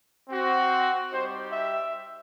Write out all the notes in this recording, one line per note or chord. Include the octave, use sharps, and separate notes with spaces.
C4 F#4
G3 D#4 G4 C5
E5